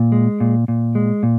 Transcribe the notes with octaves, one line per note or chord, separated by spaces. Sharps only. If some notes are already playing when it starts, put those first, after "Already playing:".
Already playing: A#2
G#3
A#2
A#2
G#3
A#2